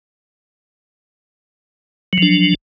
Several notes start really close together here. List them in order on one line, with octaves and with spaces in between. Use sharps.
F#3 F3 D4